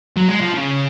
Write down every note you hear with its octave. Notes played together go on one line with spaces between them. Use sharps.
F#3
G#3
F3
C#3